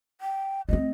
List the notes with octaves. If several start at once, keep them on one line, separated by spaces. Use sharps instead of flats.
G5
A3 C4 D#5